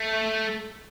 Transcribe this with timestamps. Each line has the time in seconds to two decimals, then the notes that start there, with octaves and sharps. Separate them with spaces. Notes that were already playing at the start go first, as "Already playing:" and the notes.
Already playing: A3